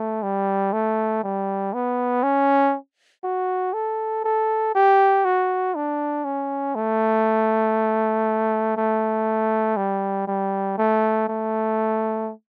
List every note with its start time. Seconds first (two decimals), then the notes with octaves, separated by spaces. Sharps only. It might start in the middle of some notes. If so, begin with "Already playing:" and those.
Already playing: A3
0.23 G3
0.73 A3
1.23 G3
1.74 B3
2.23 C#4
3.24 F#4
3.73 A4
4.24 A4
4.75 G4
5.25 F#4
5.75 D4
6.25 C#4
6.75 A3
8.77 A3
9.77 G3
10.27 G3
10.78 A3
11.28 A3